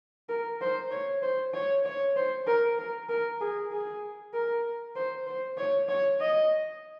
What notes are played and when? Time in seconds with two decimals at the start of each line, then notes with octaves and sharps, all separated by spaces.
0.29 A#4
0.61 C5
0.91 C#5
1.23 C5
1.54 C#5
1.85 C#5
2.16 C5
2.47 A#4
2.79 A#4
3.09 A#4
3.40 G#4
3.71 G#4
4.34 A#4
4.96 C5
5.27 C5
5.58 C#5
5.89 C#5
6.21 D#5